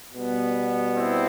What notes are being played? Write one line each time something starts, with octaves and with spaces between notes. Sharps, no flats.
B2 G3 B3
C4 E4